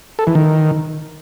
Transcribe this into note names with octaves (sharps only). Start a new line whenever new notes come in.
A4
E3
D#3